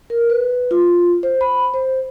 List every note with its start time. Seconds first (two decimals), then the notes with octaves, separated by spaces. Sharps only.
0.10 A#4
0.30 B4
0.71 F4
1.23 C5
1.41 B5
1.74 C5